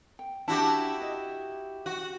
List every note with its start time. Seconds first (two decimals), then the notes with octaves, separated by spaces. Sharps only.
0.19 G5
0.48 D4 E4 F#4 G4 E5 A5
1.01 D#5
1.86 F#4